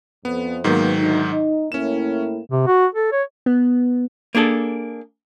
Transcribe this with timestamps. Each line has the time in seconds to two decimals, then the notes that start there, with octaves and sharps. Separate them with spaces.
0.25 F2 B3
0.64 G#2 D#3 F#3 A#3 B3
0.98 D2 D#4
1.31 D#4
1.72 A2 A#3 C#4 E4 E7
2.50 C3
2.67 F#4
2.95 A4
3.12 C#5
3.46 B3
4.35 A#3 D4 G#4 A4